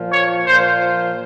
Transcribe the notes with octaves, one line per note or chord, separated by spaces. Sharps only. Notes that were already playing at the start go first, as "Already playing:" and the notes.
Already playing: A#2 F3
C#5
A#2 F3 C5